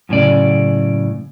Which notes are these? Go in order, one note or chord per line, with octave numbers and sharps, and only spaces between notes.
F#2 A2 C#3 D5